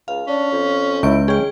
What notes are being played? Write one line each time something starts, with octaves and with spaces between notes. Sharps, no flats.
C#2 F5
C#4 D4
F2
C#2 E4 C#6 G6 D7
C#4 G#4 G5